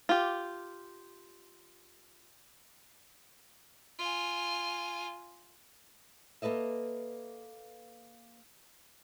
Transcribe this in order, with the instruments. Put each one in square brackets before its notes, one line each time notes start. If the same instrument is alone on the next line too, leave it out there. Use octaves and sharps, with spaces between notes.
[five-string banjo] F4 G4
[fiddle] F4 G#5
[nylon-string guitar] A#3 A4 B4 D#5 E5